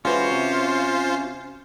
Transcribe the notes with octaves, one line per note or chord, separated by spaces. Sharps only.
E3 G#3 C#4 F4 F#4 C5
C3